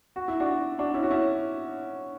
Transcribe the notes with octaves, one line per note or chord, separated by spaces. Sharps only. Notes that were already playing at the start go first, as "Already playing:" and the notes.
F#4
E4
D4 F#4
D4 F#4
C#4 E4
F#4
C#4 E4